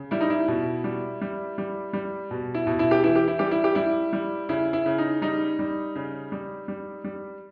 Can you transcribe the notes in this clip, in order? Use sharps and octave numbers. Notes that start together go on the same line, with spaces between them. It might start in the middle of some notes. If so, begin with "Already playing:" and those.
Already playing: C#3
G3 E4
D#4
E4
B2
G3
G3
G3
G3
B2
E4
B2
E4
G4
E3 E4
G4
E4
G3 G4
E4
G4
G3 E4
G3
C#3 E4
E4
C#3
D#4
G3 D#4
G3
C#3
G3
G3
G3